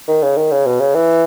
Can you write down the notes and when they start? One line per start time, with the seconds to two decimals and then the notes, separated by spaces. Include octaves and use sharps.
0.08 D#3
0.23 C#3
0.37 D#3
0.52 C#3
0.66 B2
0.80 C#3
0.95 E3